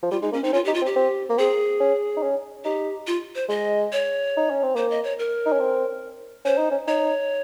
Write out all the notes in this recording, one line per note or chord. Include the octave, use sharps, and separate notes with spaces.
F3
G3 F4
G#3 D#4
A#3 C#4
C4 D#4
C#4 F4
G4
D#4
F4
C4
G4
C4
A#3
C4 G#4
C#4
D#4
C#4
D#4 G4
F4
C5
G#3 D#5
C#5
D#4
C#4
C4
A#3 C5
D#5
C#5
A#4
D#4
C#4
C4
C#4 C5
D#4
C#4
D#4 C#5